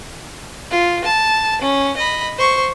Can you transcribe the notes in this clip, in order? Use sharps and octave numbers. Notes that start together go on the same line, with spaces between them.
F4
A5
C#4
D#5 B5
C5 C#6